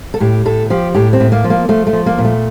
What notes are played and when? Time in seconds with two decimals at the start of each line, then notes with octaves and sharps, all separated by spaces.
0.14 A4
0.20 A2 G4
0.46 A2 A4
0.70 F3 G4
0.94 A2 G4
1.13 C4
1.20 A2
1.32 A#3
1.44 F3
1.50 A#3
1.69 F3 A3
1.87 A3
1.93 F3
2.06 A#3
2.18 A#2
2.25 A3